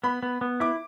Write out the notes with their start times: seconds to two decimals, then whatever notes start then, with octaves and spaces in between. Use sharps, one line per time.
0.04 B3 B5
0.23 B3
0.41 B3
0.60 E4 D6